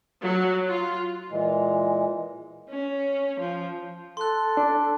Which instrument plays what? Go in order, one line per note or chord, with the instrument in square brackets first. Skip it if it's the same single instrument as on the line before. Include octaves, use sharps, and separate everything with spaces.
[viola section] F#3
F4
[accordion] A#2 E3 G#3
[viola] C#4
F3
[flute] A4 [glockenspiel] C6 F#6
[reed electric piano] D4